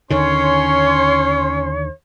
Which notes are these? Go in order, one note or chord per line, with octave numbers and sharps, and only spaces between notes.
D#2 D3 D#3 C#4 C#5 C6